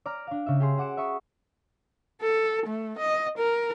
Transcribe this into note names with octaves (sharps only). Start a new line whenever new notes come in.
D5 A#5 F6
D4 F5
C#3 E5
G4 G#4 C6
F#4 F#5 D6 C#7 E7
E5 B5 C#6 D#6
A4
A3
D#5
A#4